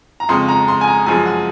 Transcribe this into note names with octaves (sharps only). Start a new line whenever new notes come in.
A#5
F2 C#3 G#3 C6
A#5
C6
G#5
A#5
F#2 F3 G#3 G#5
F#5